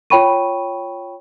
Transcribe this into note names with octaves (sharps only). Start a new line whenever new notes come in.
F4 C#5 G5 B5 C#6 D#7